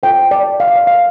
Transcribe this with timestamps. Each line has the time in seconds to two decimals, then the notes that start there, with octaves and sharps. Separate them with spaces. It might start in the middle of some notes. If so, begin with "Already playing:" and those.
0.03 F4 A4 C5 G5
0.31 D5
0.60 F5
0.68 D5
0.76 F5
0.87 F5